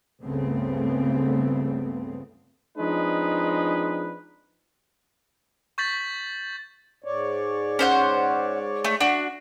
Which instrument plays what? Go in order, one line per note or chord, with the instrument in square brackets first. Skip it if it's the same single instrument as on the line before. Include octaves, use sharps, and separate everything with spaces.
[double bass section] C#2 G2 C#3 A3 B3 C4
[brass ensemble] F3 G#3 C4 D4 D#4 B4
[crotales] C#6 G6 A6 B6 F#7
[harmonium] G#2 C#5 D5
[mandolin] C#4 C5 F#5
A3
D4 F#4